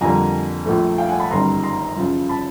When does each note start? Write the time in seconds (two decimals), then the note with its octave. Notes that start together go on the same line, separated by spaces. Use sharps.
0.01 F2 D3 G3 A#3 G#5 A#5
0.66 A#1 A#2 F3 A3
0.98 F5 G5
1.09 F#5 G#5
1.20 A5 B5
1.31 G1 F#2 D#3 G3 A#5 C6
1.63 A#5 C6
1.96 F#2 C#3 F3
2.29 A5 B5